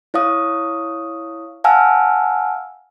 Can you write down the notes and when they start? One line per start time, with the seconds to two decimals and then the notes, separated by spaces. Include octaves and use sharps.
0.14 E4 C#5 F5 D#6
1.64 F5 F#5 G#5 A5 E6 F6